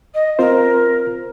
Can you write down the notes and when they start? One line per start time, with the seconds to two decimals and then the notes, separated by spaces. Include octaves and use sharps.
0.14 D#5
0.39 C4 F4 A#4 C5